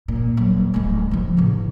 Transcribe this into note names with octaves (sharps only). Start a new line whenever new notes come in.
A#2
D#1 F#3
D1 G#3
D3 F3
A1 C#3